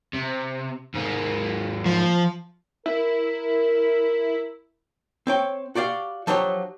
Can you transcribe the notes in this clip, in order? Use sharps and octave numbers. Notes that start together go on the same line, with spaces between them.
C3
G#2 A#3
F3
E4 A#4
C4 C#5 G5
F#4 G4 D5 F5
F3 F#3 D4 G4 C#5